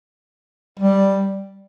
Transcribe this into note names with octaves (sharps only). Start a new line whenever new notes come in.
G3